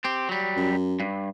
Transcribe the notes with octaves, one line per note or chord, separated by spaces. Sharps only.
C4 G4
F#3 G3
F#2
G2